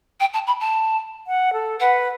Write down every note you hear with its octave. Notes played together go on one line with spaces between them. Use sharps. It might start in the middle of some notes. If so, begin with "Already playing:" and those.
G5
A5
B5
A5
F#5
A4
B4 F#5